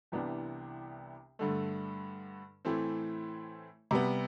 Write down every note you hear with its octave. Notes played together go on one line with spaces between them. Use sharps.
C2 C3 E3 B3 D4
G2 D3 A3
A2 E3 A3 C4
C3 G3 B3